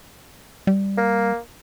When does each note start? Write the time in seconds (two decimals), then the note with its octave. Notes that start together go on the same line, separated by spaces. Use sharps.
0.67 G3
0.97 A#3